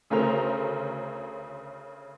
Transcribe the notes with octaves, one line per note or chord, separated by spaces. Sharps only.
D2 C#3 A3 A#4 C5 F7